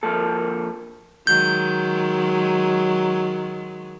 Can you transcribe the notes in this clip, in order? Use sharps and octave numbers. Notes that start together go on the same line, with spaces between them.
F3 A#3 A4
D#3 F#3 G#3 G6